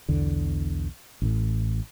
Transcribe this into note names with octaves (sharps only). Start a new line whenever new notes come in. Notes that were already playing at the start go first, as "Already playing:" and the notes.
B1 E2 D3
A1 A2